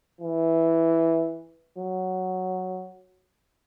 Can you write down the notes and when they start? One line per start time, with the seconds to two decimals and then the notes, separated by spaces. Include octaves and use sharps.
0.21 E3
1.78 F#3